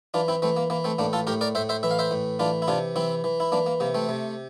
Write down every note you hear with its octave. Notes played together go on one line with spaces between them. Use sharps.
E3 D4 F4
C4 E4
E3 A3 C4
A#3
E3 A#3
A3 C4
A2 A#3 D4
F4 A4
A2 G4 A#4
A#4 D5
A2 C5 E5
C5 E5
E3 E5
F5
C5 E5
A2
E3 D4 F4
E4
C3 D4 F4
E3 C4 E4
E3
E4
E3 A#3 D4
A#3
C3 A#3
A3 C4
C3